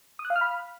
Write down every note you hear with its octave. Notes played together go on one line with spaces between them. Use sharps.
D#6
F#6
F5
F6
B5